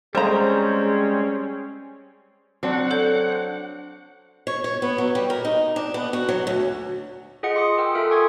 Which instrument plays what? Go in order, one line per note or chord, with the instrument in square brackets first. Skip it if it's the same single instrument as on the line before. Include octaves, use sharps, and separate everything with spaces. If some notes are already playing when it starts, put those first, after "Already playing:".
[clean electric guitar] G3 G#3 [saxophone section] C4 C#4 [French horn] G#4 [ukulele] C5 A#5
[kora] F#3 D4 F#4 [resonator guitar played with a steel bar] C4 [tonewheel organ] F#5
[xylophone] A4 C#5 G6
[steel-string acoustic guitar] C#5
C#5
B3
F#3
G3
A#4
D#4
D4
B3
F#4
F#3
D2
[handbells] F4 G#4 D#5 F#5 C#7
C6 D6 D#6 C#7
A#4 F#5 G5 E6
F4 A4 E5 F6 D7
G#5 C6 C#6 D#6 G#6